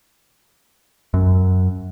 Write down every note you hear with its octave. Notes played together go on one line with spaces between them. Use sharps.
F#2